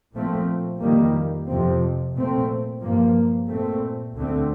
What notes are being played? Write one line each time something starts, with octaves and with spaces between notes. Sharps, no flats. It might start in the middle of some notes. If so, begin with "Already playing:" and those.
A#2 F3 A3 C4
F2 D#3 G3 A#3
F2 C3 F3 C4
A#2 A3 C4
G2 F3 A#3
A#2 A3 C4
D2 D3 A3 C4